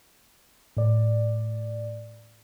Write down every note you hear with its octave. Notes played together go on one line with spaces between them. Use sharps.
A2 D5